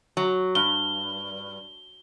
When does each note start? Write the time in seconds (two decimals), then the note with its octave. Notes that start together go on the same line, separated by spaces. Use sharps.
0.17 F#3
0.55 G2 G7